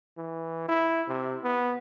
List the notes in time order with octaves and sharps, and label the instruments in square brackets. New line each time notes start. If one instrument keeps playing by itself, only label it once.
[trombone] E3
E4
C3
B3